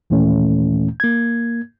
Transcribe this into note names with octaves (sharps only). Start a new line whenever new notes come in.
D#2 A#2 E3 A3 C#4
A#3 G#6